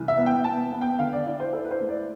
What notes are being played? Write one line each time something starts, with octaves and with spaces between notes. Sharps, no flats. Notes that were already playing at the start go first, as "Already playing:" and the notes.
Already playing: C2 E3
E5
B3
G5
B3 A5
B3
G5
D3 F5
D5
E4 D5
C5
E4 A4
B4
C5
A3
D5